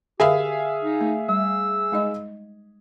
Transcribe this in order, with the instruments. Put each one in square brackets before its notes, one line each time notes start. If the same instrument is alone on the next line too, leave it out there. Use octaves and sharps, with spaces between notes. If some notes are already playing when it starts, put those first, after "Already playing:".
[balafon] D3 A#4 [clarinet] G4 [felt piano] G#4 E5 F5
[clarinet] D#4
[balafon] A3
[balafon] G3 [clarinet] E6
[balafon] G#3 D#4 D#5